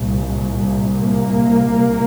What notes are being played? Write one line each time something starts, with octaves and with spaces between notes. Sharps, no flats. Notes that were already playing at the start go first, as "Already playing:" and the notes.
Already playing: C2 A#2
A#3